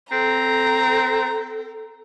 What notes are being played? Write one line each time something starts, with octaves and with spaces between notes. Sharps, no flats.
C4 A4 A#5